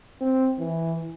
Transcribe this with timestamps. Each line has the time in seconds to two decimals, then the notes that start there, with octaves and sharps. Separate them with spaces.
0.21 C4
0.59 E3